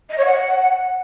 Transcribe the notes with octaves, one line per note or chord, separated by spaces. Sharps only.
D#5
C#5
F#5